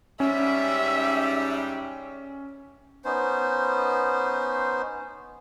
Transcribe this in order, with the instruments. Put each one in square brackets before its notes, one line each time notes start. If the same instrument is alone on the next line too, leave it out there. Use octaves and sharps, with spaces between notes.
[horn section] G#2 G3 [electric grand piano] C#4 [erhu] E5
[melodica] B3 C#4 D#4 C5